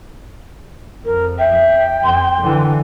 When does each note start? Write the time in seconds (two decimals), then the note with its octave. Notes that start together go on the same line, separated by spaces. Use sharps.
1.05 F2 A#4
1.39 E5 G5
2.04 F2 C6
2.42 D3 E3